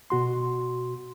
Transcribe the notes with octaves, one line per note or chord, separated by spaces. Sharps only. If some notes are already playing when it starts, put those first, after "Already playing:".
B2 F#4 C6